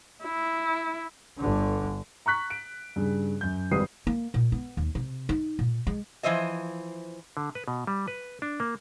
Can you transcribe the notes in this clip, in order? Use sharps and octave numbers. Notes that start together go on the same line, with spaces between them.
E4
G1 D3
A#5 C#6 F#6 B6
D7
G2 C#3
F#2 G6
G#1 G3 B4 D#6 C7
A#3
A#2
B3
D#2
C3
D#4
A#2
G#3
E3 F3 C5 D#5 E5
D3
B4
B2
G3
B4
D4
A#3